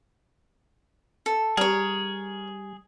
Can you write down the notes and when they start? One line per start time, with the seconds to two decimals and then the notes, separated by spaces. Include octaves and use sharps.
1.26 A4
1.57 G3 G#4 A#4 C#5